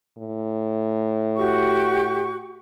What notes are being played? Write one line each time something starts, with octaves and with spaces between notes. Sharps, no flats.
A2
F#4 G4 C#6